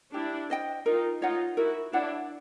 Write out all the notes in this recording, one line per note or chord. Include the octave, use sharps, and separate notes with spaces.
D4 E4 G4
C5 D#5 G5
D#4 F4 A#4
D#4 F4 C#5 F#5
E4 F#4 A#4
D4 E4 C#5 F#5